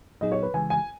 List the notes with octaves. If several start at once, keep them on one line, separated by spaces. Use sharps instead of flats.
A#2 F#3 B3 D#4 G#4 D#5
C#5
B4
C#3 E3 G#3 G#5
G#5